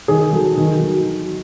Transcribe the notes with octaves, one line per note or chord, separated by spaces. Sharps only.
D#3 G#4
F#3 A4
D#3
F#3